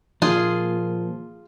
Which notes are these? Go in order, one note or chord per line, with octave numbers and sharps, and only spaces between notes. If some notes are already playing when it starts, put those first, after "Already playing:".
A#2 F3 F4 G#4